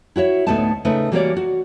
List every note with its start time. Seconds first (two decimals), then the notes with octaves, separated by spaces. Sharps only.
0.16 E4 F#4 C#5 E5
0.47 D2 A2 A3 B3 D#4 A5
0.85 C#3 A3 D#4 B4
1.12 E3 G3 A#3 F#4 C#5 D5
1.37 F#4